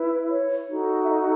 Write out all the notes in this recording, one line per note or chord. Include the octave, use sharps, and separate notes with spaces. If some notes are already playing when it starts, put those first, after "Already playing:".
Already playing: E4 B4
C#5
D#4 F#4 A4
E5
D#5